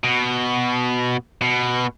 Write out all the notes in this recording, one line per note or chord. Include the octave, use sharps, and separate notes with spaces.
B2
B2